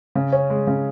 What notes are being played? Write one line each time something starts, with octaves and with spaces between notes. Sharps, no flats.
C#3
C#4
G#3
C#3